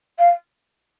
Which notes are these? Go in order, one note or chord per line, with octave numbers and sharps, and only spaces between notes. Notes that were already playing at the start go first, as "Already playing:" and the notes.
F5